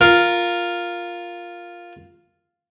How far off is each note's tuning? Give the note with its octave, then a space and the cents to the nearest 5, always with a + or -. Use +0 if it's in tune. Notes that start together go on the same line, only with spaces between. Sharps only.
F4 +0 A#4 +0